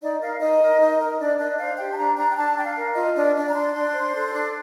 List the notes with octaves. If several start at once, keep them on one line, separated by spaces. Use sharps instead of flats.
D#4 D5
A#4 F5
D#4 D#5
A#4
D#4
A#4
D4 D5
D4 D#5
C5 F5
G4 G5
A5
D4 A#5
D4 A#5
G5
D4 A5
D4 G5
F5
A#4
F4 D#5
D4 D#5
D4 D5
A#5
D4 C6
D4
C5
A4
D4